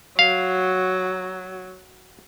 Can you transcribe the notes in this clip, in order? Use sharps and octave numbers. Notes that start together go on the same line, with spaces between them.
F#3 F5